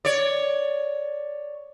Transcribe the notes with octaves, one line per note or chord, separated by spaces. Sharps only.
C#5 D5